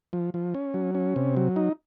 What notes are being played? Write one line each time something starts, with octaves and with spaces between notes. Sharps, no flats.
F3
F3
C#4
F#3
C#4
C3
F#3
D#4